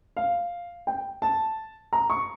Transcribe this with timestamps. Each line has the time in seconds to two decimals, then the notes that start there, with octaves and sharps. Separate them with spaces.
0.17 F5
0.87 G5
1.22 A5
1.93 A#5
2.10 C#6